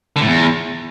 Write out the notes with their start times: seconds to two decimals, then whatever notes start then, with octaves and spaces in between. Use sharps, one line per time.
0.16 D3
0.21 A2
0.26 E2